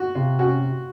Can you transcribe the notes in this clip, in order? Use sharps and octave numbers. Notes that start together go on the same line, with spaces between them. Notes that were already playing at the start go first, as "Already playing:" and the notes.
Already playing: F#4
C3 F4
C#4 F#4